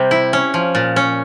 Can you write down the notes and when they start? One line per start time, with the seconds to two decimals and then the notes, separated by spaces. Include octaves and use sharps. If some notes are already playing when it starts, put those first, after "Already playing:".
Already playing: C3 G3
0.11 E4
0.33 C#4
0.54 F3
0.75 A#2
0.96 C#4